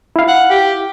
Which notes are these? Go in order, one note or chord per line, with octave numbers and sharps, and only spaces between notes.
E4 F5
F#5
G4